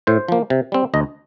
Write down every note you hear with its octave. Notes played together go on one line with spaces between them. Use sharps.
A2 C5
F3 A#3
C3
G3 C4
D2 D#5